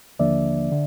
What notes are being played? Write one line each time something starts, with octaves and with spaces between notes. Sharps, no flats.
D#2 D3 F3 A#3 D4 D5 E5
D3